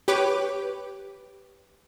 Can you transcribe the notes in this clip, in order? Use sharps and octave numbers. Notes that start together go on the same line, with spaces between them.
G4 B4 C#5 D6